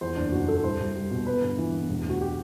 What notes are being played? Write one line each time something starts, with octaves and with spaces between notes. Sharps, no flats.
E2 C5
F#1 D4
F#1 F#4
F#1 A4
C2 C5
C2
G3
B2
B3 B4
G1
E3
B3
E1
D2 F#4
G4